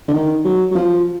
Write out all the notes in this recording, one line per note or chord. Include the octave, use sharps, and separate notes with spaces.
D3
D#3
F#3
F#3
F3